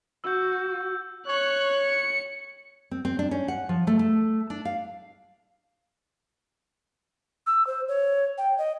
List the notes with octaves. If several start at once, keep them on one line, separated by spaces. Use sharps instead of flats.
F#4 E6 G6
C#5 F#6 C#7
C#7
C4
C4
D4
C#4
F#5
F3
A3
A3
D4
F5
E6
C5
C#5
G5
D#5